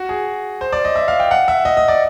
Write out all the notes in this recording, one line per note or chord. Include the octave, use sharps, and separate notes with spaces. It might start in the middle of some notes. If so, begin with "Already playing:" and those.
Already playing: F#4
G#4
C5
D5
D#5
E5
F5
G5
F#5
E5
D#5
D#5
D5